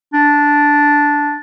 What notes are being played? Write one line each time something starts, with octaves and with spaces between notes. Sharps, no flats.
D4